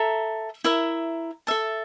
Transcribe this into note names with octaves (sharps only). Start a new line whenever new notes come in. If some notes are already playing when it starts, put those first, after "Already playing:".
Already playing: A4 E5 A#5
E4 A#4 E5
A4 E5 A5